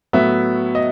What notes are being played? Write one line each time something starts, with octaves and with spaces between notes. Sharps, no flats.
A2 F#3 B3 E5
D#5